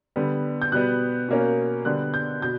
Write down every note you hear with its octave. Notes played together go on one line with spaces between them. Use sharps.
D3 G3 B3
G6
B2 G3 B3 F#6
B2 A#3 C#4
D3 G3 B3 F#6
G6
B2 G6